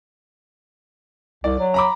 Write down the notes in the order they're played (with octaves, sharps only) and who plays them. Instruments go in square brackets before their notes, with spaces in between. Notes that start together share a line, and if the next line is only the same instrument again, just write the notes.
[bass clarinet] C2 [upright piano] D5
[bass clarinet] F#3
[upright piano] A#5 B5 D6